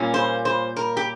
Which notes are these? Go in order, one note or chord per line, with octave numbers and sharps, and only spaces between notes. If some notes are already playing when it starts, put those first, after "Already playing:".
Already playing: A#2 G3 A#3 C#4 F4
C5
C5
A#4
G4